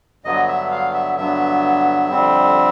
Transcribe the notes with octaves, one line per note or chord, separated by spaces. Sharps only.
G2 D3 F#3 B3 D#5
E5
F5
E5
G2 D3 F#3 B3 E5
F2 D3 G3 C4